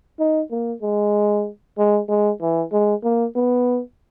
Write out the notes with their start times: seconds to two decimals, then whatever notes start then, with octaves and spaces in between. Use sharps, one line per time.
0.19 D#4
0.51 A#3
0.82 G#3
1.78 G#3
2.09 G#3
2.41 E3
2.72 G#3
3.03 A#3
3.35 B3